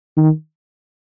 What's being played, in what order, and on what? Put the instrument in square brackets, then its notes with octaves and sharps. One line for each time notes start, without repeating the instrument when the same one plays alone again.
[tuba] D#3